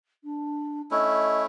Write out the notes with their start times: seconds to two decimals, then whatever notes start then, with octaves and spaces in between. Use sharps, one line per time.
0.24 D4
0.91 A3 C#4 E4 D#5